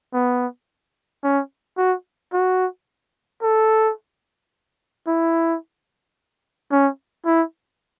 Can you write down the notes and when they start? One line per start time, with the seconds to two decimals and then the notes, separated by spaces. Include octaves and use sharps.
0.14 B3
1.24 C#4
1.77 F#4
2.33 F#4
3.42 A4
5.07 E4
6.72 C#4
7.26 E4